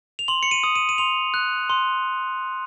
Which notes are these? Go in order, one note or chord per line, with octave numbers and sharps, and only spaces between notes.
F7
C6 F#7
C#7
D#7
D#6
D#7
D#7
C6 F7
F#6
C6